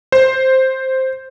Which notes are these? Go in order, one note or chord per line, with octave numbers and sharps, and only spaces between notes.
C5